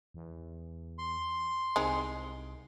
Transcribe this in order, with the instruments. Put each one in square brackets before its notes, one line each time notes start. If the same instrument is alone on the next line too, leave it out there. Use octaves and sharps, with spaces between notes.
[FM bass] E2
[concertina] C6
[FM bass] C2 [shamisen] G#3 C4 D#4